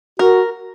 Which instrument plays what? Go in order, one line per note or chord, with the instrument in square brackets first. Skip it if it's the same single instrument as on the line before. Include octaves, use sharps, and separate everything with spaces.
[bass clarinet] F#4 [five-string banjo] A#4